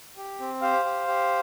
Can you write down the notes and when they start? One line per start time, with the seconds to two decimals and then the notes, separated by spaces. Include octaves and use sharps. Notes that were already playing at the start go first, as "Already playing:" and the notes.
0.17 G4
0.40 C4
0.62 G4 C5 F5
0.85 G4
1.08 G4